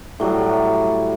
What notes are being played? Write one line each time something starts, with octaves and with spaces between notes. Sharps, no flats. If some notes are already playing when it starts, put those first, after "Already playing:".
A2 F#3 G3 D6